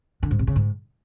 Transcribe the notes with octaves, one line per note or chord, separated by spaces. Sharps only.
D3
G#2
C3
C#3
G#2